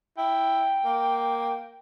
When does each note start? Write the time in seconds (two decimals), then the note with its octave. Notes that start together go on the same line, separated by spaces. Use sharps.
0.17 E4 G5
0.85 A#3